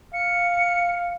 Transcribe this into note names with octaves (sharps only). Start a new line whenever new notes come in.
F5 C#7